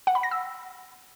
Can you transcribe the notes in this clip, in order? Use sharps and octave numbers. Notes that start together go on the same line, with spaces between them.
F#5
B5
A#6
E6